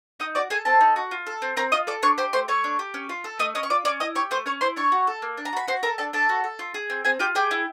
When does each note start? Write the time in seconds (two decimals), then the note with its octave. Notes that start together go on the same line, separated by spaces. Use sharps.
0.20 D#4 D#5 D#6
0.35 F#4 D5 D6
0.50 G#4 A4 G#5
0.65 C4 A4 A5
0.81 D#4
0.96 F#4
1.11 F4
1.27 A4
1.42 C4
1.57 C4 A#4 A#5
1.72 F4 D#5 D#6
1.87 A4 D5 D6
2.02 D4 C#5 C#6
2.18 G4 C5 C6
2.33 A3 C5 C6
2.48 A3 C#5 C#6
2.64 D4
2.79 G4
2.94 C#4
3.09 F4
3.24 A4
3.39 A3 D#5 D#6
3.55 C#4 D#5 D#6
3.63 C#6
3.70 F4 D5 D6
3.85 C#4 D5 D6
4.00 E4 D#5 D#6
4.15 G4 C#5 C#6
4.31 A3 C5 C6
4.46 C#4 C#5 C#6
4.61 E4 C5 C6
4.76 D4 C#5 C#6
4.92 F#4
5.07 A4
5.22 A#3
5.37 D4
5.45 A#5
5.53 F#4 B5
5.68 F#4 C5 C6
5.83 A4 A#4 A#5
5.98 D4 A4 A5
6.13 D4 A4 A5
6.29 F#4
6.44 A4
6.59 F4
6.74 G#4
6.90 C4
7.05 C4 G#4 G#5
7.19 F4 G4 G5
7.35 G4 G#4 G5
7.51 E4